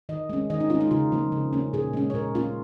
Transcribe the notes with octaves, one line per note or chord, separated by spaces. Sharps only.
D#3 D#5
G#3 C#4
D#3 D#5
D#4
G#3 C#4 F4
D#4
C#3 F4
F3 A#3
C#3
A#3 C#4
A#2 G#4
G#3 C#4
C#5
A#2 A#4
A#3 C#4 F4